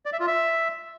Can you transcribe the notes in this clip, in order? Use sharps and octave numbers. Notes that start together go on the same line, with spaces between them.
D5
E5
F4
E5